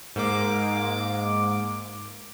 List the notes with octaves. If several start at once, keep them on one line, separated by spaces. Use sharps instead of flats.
G#2 A#3 D6